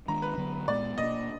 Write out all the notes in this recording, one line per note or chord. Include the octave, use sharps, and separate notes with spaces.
D#3 G#3 D4 A#5
B4
D3 F#3 B3
A#2 G#3 B3 D5
B2 A#3 D4 D#5